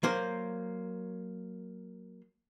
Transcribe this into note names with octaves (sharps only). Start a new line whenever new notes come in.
F#3 A#3 C5